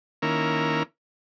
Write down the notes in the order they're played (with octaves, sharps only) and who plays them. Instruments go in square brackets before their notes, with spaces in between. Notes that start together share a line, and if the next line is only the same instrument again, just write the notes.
[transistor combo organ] D#3 A#3 C#4 E4 A#4